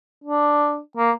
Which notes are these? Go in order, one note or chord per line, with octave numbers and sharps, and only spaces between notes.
D4
A#3